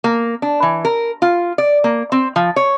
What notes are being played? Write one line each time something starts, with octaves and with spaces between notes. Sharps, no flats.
A#3
D4
E3
A#4
F4
D5
A#3
C4
F3
C#5